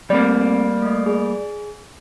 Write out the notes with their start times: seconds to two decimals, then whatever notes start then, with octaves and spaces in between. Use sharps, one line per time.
0.10 G3 A3 A#3 C4 D5
0.82 A3 D#5
1.06 G#4